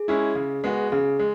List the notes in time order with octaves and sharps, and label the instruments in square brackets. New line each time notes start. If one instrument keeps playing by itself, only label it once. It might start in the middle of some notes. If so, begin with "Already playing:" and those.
Already playing: [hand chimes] G#4
[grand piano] G#3 C#4 E4
C#3
G#3 B3 F#4
[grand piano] C#3 [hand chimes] G#4
[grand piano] G#3